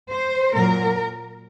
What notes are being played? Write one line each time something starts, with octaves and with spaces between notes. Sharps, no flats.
C5
A#2 F#3 A#4